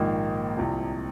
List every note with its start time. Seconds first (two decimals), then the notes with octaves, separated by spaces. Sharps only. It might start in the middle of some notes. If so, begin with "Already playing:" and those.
Already playing: A#1 G#2 D#3 A#3 D#4
0.57 C2 C3 F3